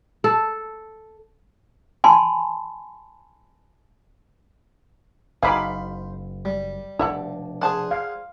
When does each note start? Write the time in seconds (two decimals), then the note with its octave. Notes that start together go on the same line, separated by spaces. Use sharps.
0.24 A4
2.04 G#5 A5 B5 C6
5.43 F#1 F#3 D#4 G#4 C5 F5 B5 D6
6.45 G3
6.99 F1 B2 D4 A4 E5 F#5
7.61 G#4 C5 D5 F#5 A5
7.91 F5